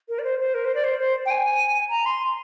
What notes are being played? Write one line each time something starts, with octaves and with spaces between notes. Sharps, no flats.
A#4
D5
C5
C5
A#4
C5
D5
C5
C5
G5
G#5
A#5
C6